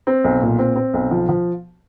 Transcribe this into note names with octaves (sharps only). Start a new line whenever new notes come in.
C4
B1
A#2
C4
C4
B1
F3
F3